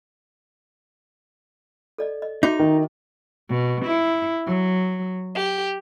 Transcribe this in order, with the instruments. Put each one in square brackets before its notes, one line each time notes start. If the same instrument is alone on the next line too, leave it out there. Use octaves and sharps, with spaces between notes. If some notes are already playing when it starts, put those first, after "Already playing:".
[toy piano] A4 D5 D#5
D#5
[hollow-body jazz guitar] D#4 [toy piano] F#4 E5 D6
[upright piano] D#3
[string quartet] B2
E4
F#3
G4